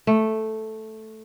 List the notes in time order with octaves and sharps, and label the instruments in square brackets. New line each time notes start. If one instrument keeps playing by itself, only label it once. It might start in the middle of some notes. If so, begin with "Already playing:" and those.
[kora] A3